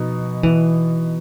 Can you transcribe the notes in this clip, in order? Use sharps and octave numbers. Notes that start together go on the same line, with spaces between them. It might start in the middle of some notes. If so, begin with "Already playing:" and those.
Already playing: B2 F3 B3 D#4
E3